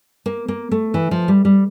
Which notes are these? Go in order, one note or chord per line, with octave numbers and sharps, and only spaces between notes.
A#3
A#3
A3
E3
F3
G3
G3